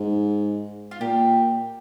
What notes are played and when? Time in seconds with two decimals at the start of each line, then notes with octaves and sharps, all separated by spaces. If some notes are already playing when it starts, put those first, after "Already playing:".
Already playing: G#2
0.91 F4
1.00 A#2 G4